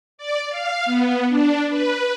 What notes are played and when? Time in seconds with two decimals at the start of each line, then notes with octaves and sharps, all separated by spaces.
0.18 D5
0.50 F5
0.85 B3
1.29 D4
1.70 B4